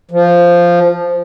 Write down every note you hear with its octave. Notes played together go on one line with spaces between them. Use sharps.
F3